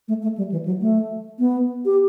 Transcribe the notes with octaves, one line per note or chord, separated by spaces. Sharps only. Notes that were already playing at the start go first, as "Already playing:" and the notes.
A3
A3
G3
E3
F#3
A3
B3
G4